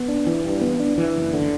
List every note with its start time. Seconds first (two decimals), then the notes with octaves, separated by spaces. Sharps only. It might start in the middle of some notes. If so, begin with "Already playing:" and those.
Already playing: B3
0.08 D4
0.27 E3
0.44 G2
0.61 B3
0.80 D4
0.98 E3
1.16 F#1
1.34 D3